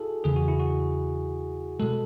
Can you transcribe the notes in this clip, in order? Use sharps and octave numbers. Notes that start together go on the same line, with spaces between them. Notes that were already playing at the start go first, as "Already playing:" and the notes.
Already playing: E4 F#4 G#4 A4
E2 C#3 E3 G#4
F#4
E4
F#4
B2 G#3 A4